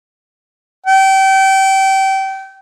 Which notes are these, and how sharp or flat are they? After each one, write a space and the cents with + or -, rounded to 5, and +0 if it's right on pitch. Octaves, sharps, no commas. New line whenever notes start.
G5 -30